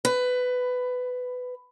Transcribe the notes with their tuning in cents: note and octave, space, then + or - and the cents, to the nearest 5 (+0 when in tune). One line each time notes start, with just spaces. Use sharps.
B4 +15